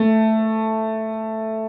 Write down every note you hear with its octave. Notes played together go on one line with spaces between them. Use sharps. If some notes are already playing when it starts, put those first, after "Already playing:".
Already playing: A3